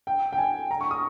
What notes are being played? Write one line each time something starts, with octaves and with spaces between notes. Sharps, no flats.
G5
G5
G#5
A#5
C#6
D#6